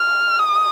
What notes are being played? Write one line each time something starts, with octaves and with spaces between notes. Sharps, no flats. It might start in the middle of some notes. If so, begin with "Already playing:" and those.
Already playing: F6
D#6